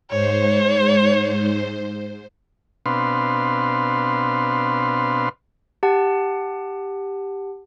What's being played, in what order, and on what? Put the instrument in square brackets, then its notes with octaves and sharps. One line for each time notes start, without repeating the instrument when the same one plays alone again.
[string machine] G#2 C5 [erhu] C#5
[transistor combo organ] B2 C4 D4 B4 F5 C6
[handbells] G4 F#5 A5